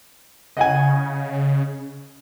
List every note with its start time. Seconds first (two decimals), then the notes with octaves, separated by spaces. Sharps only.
0.57 C#3 D#5 F#5 G#5